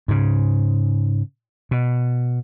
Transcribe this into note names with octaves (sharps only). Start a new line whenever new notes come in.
G#2 C#3
B2